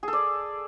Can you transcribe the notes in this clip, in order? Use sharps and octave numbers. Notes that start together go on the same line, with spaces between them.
G#4 A4 D5